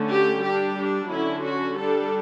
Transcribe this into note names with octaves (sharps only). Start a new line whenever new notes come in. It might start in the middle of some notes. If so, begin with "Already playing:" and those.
Already playing: D3 A3 C#4
G4
G3 D4 G4
D4
D3 F#3 C#4 E4
F#4
G3 D4 A4